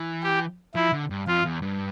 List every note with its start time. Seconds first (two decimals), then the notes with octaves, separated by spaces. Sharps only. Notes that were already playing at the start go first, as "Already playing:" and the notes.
Already playing: E3
0.23 G4
0.75 F3 E4
0.92 D3
1.10 G2
1.27 F2 F4
1.45 E2
1.62 G2